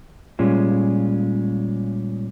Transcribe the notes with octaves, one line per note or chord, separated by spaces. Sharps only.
A#2 G3 G#3 C#4 F4